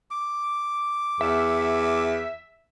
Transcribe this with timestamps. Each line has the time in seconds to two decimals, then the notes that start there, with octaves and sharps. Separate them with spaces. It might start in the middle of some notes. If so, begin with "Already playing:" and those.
0.11 D6
1.21 E2 E5